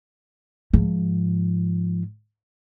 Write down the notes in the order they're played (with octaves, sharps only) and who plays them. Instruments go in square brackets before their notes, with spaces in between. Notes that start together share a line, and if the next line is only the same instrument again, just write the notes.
[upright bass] G#2 F3